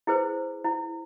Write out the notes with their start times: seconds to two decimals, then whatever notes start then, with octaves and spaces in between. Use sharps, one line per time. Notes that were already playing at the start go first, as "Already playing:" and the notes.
0.07 E4 G#4 B4 C5
0.64 E4